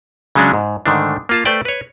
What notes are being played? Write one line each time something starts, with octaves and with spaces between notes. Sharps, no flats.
C#3 F#3 G#3 C#4 D4
G#2
G#2 D3 D#3 A3 D4
A#3 F4 A5
A3 B4 C5 D5 G5
B4 C#5